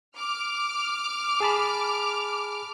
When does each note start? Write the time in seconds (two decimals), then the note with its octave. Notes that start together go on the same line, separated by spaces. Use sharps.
0.18 D6 F6
1.40 G#4 A5 B5